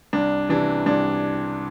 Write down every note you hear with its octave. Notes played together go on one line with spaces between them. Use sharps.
C2 D4
C3 E3 D4
C2 D4